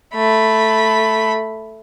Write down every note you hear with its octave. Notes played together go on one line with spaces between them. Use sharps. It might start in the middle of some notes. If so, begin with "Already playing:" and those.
A3 B5